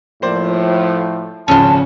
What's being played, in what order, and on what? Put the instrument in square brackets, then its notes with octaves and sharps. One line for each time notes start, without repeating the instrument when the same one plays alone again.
[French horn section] A2 F3 [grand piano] A#3 C5 D5
[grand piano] G#1 C#3 F3 [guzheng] C#4 F4 [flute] A5